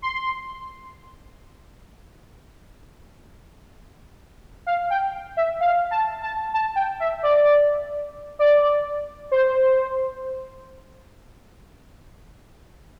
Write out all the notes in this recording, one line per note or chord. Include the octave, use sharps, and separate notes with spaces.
C6
F5
G5
E5
F5
A5
A5
A5
G5
E5
D5
D5
C5